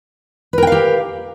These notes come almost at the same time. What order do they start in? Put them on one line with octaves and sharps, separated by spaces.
B4 A#4 G5 F5 G4